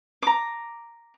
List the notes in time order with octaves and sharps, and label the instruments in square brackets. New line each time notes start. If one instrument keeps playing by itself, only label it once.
[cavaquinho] A#5 D6